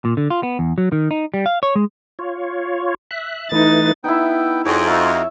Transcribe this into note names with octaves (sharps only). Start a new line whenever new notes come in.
A#2
D3
F4
B3
E2
F#3
D#3
D#4
G3
F5
C#5
G#3
F4 C#5
E5 F#6
E3 A3 D#4 B4 A6
B3 D#4 E4 G5
F2 F#4 G#4 C#5
D#4 F#4 E5 F5 A5